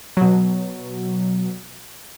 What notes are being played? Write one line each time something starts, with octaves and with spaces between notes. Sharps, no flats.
B2 F#3